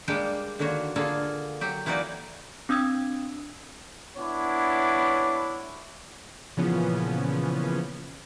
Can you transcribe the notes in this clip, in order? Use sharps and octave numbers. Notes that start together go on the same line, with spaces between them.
G3 G#3 A#3 D4 G4
D3 D#3 A#3 F#4 C#5
D3 A#3 F4 G#4 A4
F#3 G4
E3 A#3 D#4 F#4 D5
C4 D4 D#6 E6 G#6
B3 D4 E4 C#5 D6
A#2 C#3 E3 F3 B3 C#4